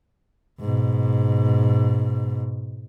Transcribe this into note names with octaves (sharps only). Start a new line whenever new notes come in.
G#2 B2